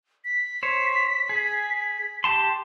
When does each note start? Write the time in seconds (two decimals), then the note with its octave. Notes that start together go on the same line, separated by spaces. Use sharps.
0.25 B6
0.63 C5 C#5
1.29 G#4
2.24 G4 A5 C6